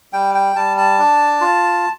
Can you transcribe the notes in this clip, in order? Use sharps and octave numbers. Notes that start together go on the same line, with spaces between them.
G3 G5
G5
G3 A5
A5
D4
F4